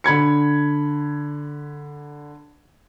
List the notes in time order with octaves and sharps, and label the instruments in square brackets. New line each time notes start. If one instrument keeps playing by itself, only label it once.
[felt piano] D3 B5 G#6 C#7